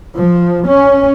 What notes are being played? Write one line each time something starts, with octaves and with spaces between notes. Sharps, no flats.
F3
C#4